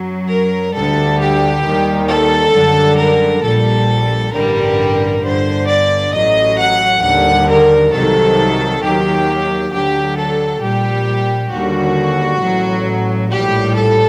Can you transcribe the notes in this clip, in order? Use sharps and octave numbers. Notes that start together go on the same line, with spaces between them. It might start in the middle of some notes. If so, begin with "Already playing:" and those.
Already playing: F#2 F#3
A#4
D2 D3 G3 A4
G4
D#2 D#3 G3
A4
F#2 D3 G3
A#4
A#1 A#2 G3 A4
A1 G2 D3 G3 A#4
G1 G2 D3 C5
D5
A1 A2 F#3 D#5
F#5
D#2 D3 G3 F#5
A#4
C2 C3 D#3 F#3 A4
D#2 D#3 F#3 G4
D2 D3 F#3 G4
A4
A#1 A#2 G3 G4
D#2 D3 G3 F#4
A1 A2 F#3
A#1 A2 G3 G4
A4